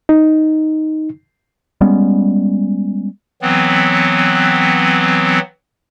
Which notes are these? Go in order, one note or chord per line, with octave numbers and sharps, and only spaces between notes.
D#4
G3 G#3 B3 C#4
E3 F#3 B3 C4